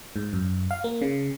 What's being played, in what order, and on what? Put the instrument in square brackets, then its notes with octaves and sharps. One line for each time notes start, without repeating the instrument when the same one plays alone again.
[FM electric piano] G#2
F#2
F5
A#3
C#3